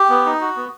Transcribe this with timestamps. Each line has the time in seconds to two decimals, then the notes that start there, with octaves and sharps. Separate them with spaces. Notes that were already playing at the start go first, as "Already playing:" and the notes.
Already playing: G4
0.09 B3
0.26 D#4
0.41 F#4
0.56 B3